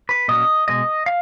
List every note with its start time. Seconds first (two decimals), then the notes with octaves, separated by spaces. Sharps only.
0.09 B4
0.28 A#2 F#3 C#4 D#5
0.68 B2 G#3 D#5
1.06 F5